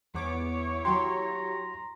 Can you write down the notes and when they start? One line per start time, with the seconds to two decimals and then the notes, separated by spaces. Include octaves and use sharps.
0.14 E2 B3 E4 C#5 D6
0.85 F#3 F#4 G4 A#5 C6